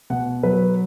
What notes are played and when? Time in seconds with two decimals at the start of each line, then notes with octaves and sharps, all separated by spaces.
0.10 B2 F#5
0.43 F#3 B4